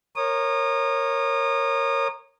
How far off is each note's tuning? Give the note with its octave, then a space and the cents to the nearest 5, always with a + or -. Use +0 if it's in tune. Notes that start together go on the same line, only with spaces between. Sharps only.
A#4 +0 C#5 -20 D#6 -30